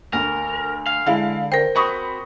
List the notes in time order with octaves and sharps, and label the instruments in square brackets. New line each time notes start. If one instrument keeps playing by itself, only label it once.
[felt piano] D2 [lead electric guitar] A#4
[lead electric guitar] F5
[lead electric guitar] D3 [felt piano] G#3 E4 F5
[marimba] A#4 C5 [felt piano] G5
[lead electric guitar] C4 F#4 [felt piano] B5 C#6 D#6